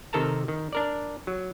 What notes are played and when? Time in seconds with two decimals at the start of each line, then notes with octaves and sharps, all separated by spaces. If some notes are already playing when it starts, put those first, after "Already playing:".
0.13 C3 D#3 A4 A#4 A5 A#5
0.48 D#3
0.73 D4 A#4 D5
1.27 F#3